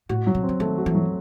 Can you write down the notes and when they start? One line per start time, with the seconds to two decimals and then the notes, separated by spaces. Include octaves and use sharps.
0.09 A2 F#4
0.27 F#3
0.35 C3
0.43 C4
0.49 C#3
0.60 D#3 A3
0.78 F#4
0.86 E3
0.95 F#3